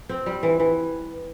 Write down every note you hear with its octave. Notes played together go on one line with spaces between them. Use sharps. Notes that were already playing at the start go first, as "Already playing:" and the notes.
C4
G3
E3
E3